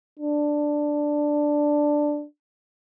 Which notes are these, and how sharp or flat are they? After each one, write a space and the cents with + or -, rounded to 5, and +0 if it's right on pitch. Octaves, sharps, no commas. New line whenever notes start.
D4 +5